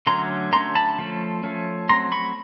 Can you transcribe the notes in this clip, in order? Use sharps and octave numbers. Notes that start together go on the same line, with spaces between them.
D3 F#3 A3 C#4 A#5 C6
D3 F#3 A3 C#4 A#5 C6
A5 B5
F3 A3 C#4
F3 A3 C#4
F#3 A3 C4 A#5 C6
B5 C#6